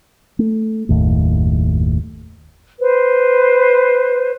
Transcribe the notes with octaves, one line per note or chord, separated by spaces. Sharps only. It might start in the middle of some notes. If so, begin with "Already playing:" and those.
A3
F#1 D#2 A2
B4 C5